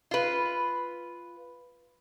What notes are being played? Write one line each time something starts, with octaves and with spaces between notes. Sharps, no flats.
F4 B4